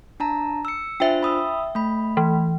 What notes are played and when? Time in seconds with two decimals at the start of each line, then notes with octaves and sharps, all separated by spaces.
0.20 D4 A5 A#5
0.65 E6 C#7
1.00 D4 F4 C5 E5 G5
1.23 B5 D#6 E6
1.75 A3 B5
2.17 E3